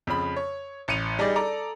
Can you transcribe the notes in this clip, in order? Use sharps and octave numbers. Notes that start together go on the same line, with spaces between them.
F2 C#3 B5
C#5
A1 C#7 D#7 F7
G3 D#4 G#4 D5
A4 D5 A#5